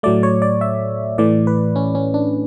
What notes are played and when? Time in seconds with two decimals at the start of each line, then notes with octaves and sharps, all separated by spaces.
0.03 A2 F#3 A3 D5
0.23 C#5
0.42 D5
0.61 E5
1.18 A2 E3 A3 D5
1.47 B4
1.76 C#4
1.95 C#4
2.14 D4